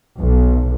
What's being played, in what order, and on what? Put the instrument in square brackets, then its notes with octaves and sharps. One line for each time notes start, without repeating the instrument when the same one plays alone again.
[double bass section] B1